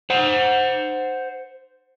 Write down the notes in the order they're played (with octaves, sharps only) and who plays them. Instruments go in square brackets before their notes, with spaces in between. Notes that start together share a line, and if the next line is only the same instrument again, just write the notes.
[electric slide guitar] C5 F#5